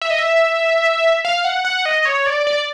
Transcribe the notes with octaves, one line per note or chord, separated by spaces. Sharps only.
E5
D#5
E5
F5
F#5
F#5
D#5
C#5
D5
D5